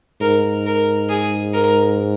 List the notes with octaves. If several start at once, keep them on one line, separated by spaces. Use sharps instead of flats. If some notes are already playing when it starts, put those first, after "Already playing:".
G#2 A#4
A#4
G#4
A#4